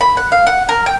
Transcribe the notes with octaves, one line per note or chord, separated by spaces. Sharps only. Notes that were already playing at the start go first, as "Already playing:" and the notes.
B5
F#5
F5
F#5
A#4
G5